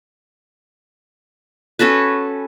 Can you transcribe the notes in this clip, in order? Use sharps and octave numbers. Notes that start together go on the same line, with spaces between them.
C#4 F#4 A4 B4